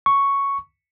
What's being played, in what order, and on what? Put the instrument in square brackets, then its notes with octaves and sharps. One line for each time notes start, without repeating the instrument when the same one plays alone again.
[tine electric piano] C#6